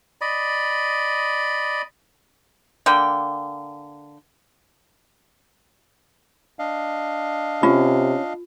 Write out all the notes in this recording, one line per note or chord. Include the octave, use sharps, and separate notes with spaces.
D5 D#5 B5
D3 A#3 G5
D4 D#5 F5
C3 C#4 F4